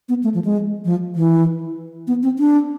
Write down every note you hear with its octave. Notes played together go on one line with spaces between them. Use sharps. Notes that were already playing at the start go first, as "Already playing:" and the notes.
B3
A3
F3
G#3
F3
E3
B3
C4
D4